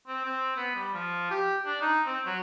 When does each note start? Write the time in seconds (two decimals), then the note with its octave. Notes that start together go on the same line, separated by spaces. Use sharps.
0.08 C4
0.25 C4
0.57 B3
0.75 G3
0.94 F3
1.31 G4
1.66 D4
1.82 D#4
2.06 C4
2.26 F#3